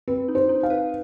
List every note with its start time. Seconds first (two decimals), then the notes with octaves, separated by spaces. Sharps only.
0.08 C4 B4
0.28 D#4
0.35 C5
0.49 D#4
0.63 F5
0.70 B4